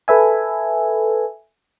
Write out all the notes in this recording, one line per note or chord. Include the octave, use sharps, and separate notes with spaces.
A4 B4 E5 G#5